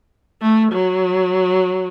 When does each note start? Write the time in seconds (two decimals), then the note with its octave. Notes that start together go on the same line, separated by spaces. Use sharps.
0.42 A3
0.73 F#3